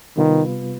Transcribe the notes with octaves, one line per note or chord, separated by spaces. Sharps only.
C3 D#3 G3 B3 F4 B4